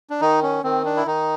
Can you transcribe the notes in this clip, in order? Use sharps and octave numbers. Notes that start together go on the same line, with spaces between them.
D4
D#3 D#4
C#4
D#3 C4
D4
E4
D#3 D#4